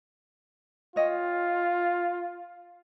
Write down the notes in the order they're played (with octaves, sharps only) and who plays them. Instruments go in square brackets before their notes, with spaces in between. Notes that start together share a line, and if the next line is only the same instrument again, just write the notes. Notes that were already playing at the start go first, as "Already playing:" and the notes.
[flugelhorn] F4 [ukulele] C#5 D#5 G5